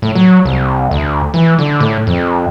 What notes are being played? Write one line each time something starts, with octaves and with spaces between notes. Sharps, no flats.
A2
F#3
C2
D2
E3
D3
A2
F2